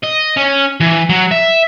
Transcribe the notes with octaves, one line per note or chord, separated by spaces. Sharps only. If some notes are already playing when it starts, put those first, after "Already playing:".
D#5
C#4
E3
F#3
E5